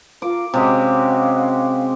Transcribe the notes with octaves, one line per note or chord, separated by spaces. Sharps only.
F4 A#4 F5 D6
C3 G#3 C#4 F#4 G4 F5